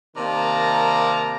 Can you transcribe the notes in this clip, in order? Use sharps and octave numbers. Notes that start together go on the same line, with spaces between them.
C3 D#3 A#3 D5 A5 A#5